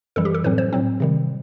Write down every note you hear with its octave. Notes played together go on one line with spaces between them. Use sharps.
F#2 E3 G3 A4
G4
A4
A2 F#3 C4 B4
C5
A2 F#3 C4
C3 D#3 G3